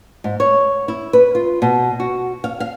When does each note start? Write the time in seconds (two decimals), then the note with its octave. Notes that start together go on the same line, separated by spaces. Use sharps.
0.24 G#2
0.40 C#5
0.88 E4
1.13 B4
1.35 F4
1.62 B2
2.00 F#4
2.44 F5
2.60 F5